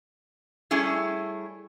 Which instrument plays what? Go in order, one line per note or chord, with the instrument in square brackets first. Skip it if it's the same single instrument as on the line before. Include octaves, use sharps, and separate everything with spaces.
[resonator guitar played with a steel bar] G3 A3 C#4 E4 G#4